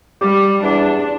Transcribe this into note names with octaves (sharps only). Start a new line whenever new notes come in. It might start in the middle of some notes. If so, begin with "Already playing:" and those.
G3 G4
E2 D4